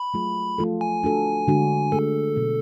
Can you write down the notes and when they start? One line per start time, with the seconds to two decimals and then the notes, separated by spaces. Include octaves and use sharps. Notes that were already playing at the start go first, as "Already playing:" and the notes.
Already playing: B5
0.14 F#3 A3 F4 G#4
0.58 F3 A3 F4 A4
0.81 G#5
1.03 A3 D4 F#4 A4
1.48 D3 G#3 D4 F#4
1.92 A3 D4 G#4 A4
2.36 B2 F#3 B3